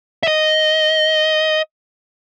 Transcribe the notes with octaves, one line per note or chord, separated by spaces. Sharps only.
E5
D#5